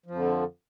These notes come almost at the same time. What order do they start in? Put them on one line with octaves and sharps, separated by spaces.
F3 F2 D3